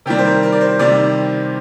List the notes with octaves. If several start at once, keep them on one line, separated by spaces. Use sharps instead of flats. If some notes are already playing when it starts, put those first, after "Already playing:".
C3 D#3 G3 G4
C5
A#4
A#4
D5
C5
C3 D#3 G3 D5